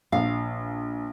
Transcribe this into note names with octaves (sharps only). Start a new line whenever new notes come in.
A#1 F5